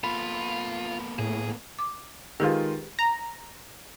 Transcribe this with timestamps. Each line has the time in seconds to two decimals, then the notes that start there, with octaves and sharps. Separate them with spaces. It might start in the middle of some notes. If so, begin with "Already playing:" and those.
0.04 A#3 B3 F4 A4 B5
1.19 A2 G#4
1.79 D6
2.40 D#3 G#3 F4 G4 G#4 B4
2.99 A#5